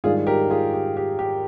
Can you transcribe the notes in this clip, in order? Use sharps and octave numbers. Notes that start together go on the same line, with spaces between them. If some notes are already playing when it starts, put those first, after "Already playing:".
G#2 D#3 G3 D4 F4 G#4
G4 A#4
F4 G#4
G4
G4
G4